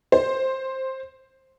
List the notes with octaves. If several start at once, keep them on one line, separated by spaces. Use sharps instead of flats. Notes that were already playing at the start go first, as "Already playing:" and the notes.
C5